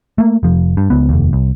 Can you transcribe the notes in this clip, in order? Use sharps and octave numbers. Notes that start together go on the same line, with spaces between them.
A3 A#3
F1 F3
G2
C#2 B3
F1 D#2
C2